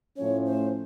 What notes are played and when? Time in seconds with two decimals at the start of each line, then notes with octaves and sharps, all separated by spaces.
0.17 A2 F3 A3 C#4 C#5
0.46 C5